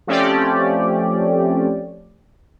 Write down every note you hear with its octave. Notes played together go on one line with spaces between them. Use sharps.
F3 A3 C4 C#4 G4 D5